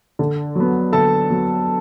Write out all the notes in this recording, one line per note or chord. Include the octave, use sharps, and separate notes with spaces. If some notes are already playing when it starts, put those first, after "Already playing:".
D3
F#3 B3
D3 A4 A5
F#3 B3